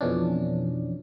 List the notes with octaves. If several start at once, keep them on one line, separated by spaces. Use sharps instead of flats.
F2 B2 E3 C#4 D4